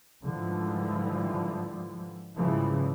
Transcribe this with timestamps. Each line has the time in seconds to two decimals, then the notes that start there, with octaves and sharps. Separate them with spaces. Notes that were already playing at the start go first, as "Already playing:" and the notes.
0.24 G#2 D3 E3 F3 G3
2.37 G#2 C#3 E3 F3 G3